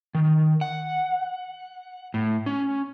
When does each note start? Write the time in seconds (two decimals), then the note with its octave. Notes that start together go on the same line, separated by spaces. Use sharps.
0.15 D#3
0.61 F#5
2.14 A2
2.46 C#4